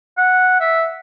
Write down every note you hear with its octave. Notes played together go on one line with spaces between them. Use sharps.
F#5
E5